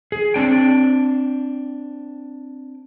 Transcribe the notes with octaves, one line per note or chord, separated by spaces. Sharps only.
G#4
C4 D4 G5